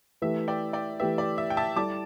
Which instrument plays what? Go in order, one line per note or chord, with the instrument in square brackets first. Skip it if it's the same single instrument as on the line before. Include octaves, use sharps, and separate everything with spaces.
[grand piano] E3 A3 G4 B4 [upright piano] E5
[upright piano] D5 G5
D5 G5
[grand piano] E3 A3 G4 B4 [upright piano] E5
[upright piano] D5
E5
G5
E5 A5
[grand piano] G3 E4 A4 D5 [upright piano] A5 D6